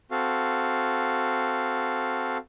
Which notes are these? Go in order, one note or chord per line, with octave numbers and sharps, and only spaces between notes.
C4 F#4 A4 F5